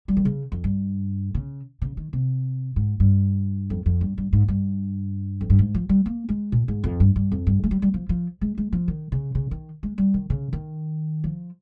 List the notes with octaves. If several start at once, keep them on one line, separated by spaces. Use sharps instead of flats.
G3
D#3
C#3
F2
G2
C#3
C#3
D#3
C3
G#2
G2
F2
F2
G2
G2
G#2
G2
F2
G2
G#2
F3
G3
A#3
G#3
A#2
G#2
F2
G2
G2
F2
G2
G#3
G3
G3
F3
F3
G#3
G#3
F3
D#3
C#3
C#3
D#3
G#3
G3
D#3
C#3
D#3
F3